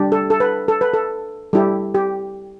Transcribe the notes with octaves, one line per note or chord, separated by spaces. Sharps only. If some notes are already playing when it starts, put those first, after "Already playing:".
Already playing: G3 D4 G4
A4
A4
B4
A4
B4
A4
G3 E4 G4 A4
G4